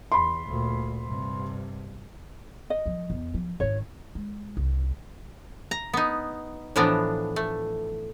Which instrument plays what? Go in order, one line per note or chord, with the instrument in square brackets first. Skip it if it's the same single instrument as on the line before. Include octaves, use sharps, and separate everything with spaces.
[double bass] E2 [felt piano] B5 C6
[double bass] D2 A#2
G2 C3
[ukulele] D#5
[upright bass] F3 G3
E2
F3
[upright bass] G#1 D4 [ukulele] C#5
[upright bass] G#3
C2
[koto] A#5
B3 D#4
A2 E3 F3 B3 D4 A#5
A3